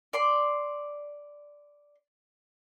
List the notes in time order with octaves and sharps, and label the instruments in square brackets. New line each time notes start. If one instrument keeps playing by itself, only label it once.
[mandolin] D5 C6